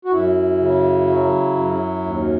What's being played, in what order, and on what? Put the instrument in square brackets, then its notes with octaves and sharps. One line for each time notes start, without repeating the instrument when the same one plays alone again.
[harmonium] F#4
F#2 E4
C#3
F#3
F#2
D#2